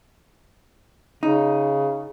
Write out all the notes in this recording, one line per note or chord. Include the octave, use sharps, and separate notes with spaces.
C#3 D#4